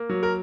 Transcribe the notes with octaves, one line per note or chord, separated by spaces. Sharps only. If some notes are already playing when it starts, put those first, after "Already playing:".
Already playing: A#3
F#3
A#4